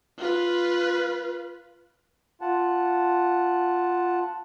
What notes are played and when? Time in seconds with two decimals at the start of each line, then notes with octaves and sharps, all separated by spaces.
0.18 F4 B4
2.41 F4 F#5 A5